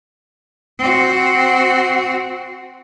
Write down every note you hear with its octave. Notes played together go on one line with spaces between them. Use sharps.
C4 F#4